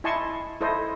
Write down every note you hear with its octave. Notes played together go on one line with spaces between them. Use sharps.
E4 D#5 G#5 A5 C6 C#6
E4 A4 C5 D#5